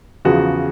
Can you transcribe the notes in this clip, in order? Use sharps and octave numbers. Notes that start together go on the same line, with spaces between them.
E2 C#3 F3 F#4